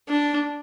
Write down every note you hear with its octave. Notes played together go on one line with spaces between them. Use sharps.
D4